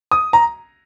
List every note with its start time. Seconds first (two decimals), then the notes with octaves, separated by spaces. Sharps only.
0.11 D#6
0.33 A#5